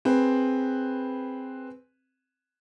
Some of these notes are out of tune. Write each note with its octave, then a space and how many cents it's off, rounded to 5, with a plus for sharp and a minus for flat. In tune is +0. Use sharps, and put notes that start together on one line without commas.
C4 +0 G#4 +0 B4 +0